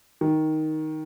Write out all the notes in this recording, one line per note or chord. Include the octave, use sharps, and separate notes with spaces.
D#3